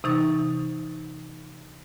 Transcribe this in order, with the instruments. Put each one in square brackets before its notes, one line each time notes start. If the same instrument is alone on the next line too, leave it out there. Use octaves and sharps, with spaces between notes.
[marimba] C3 E3 D#4 C#6 A6